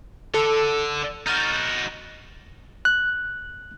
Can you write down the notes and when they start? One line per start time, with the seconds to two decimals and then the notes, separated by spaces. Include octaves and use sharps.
0.34 D3 A4
1.27 D#4 F#4 F6 G6 A6
2.85 F#6